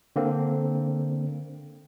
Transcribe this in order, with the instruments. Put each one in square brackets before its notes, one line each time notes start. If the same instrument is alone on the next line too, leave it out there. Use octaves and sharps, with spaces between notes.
[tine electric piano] D3 A#3 C4